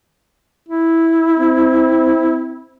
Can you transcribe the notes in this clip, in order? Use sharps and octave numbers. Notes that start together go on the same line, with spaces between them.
E4
C4